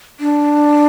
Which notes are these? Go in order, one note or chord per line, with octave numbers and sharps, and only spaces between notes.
D4